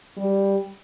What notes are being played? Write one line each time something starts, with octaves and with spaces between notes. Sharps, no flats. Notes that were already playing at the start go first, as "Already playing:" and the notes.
G3